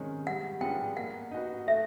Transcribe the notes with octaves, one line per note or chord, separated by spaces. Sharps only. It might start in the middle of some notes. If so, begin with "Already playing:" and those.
Already playing: C3 D#3 G#3 C#4
G3 F#5
B3 D4 F4 G#4 G5
A#3 F#5
D#4 F#4 B4
A3 E5